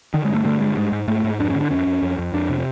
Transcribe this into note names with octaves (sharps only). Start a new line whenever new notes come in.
D3 D#3
G#3
G2
A3
D3 A3
G2 G#3
G#2 G#3
G#2
G#2 A3
G#2
F2 D4
C#4
D3
D4
F2 C#4
F2
F2
F2
F2 D4
C3